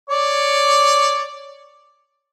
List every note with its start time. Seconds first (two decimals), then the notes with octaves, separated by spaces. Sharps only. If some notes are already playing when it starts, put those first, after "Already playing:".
0.10 C#5 D5